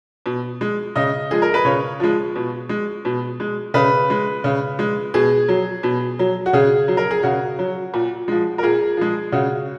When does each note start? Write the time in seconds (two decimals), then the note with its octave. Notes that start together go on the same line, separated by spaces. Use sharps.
0.26 B2
0.61 G#3
0.96 C#3 D#5
1.31 F3 G#3 G#4
1.42 A#4
1.54 B4
1.65 C#3 C#5
2.00 F3 G#3
2.36 B2
2.69 G#3
3.05 B2
3.40 G#3
3.74 C#3 B4
4.10 G#3
4.44 C#3
4.79 G#3
5.14 B2 G#4
5.48 F#3
5.83 B2
6.19 F#3
6.46 F#4
6.53 C#3 G#4
6.88 F#3
6.97 A#4
7.11 G#4
7.23 C#3 F#4
7.59 F#3
7.94 A#2
8.28 F3 G#3
8.58 A#4
8.63 A#2 G#4
8.97 F3 G#3
9.32 C#3 F#4